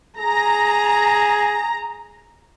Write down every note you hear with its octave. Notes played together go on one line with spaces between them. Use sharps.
G#4 A#5